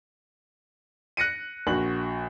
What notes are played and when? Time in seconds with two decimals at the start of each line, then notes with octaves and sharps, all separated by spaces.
1.17 F#6 A#6 C#7 D#7
1.67 A#1 F#4 F#7